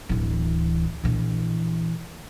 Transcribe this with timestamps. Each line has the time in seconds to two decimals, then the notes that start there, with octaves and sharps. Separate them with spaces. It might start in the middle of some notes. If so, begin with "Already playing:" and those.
0.09 D1 E3
1.04 A#1 E3